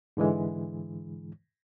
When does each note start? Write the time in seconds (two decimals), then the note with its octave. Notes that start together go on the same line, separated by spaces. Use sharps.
0.17 G#2 D3 E3 G#3